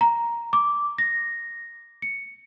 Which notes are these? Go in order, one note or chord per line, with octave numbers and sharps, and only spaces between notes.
A#5
D6
A#6
C#7